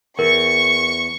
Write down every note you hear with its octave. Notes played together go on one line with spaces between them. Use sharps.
E2 A#4 C#6